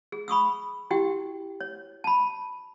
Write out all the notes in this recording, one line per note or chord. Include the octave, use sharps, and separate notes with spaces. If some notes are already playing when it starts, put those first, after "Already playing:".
G#4
B5 C#6 D#6 E6
E4 F#4 G4 G5
C#5
A5 B5